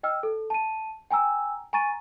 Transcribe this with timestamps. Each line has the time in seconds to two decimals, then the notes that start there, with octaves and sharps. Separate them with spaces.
0.03 D#5 G5 E6 F6
0.23 A4
0.50 A5 D#7
1.10 G5 G#5 A#5 E6
1.73 G#5 A#5 C#6 A6 D#7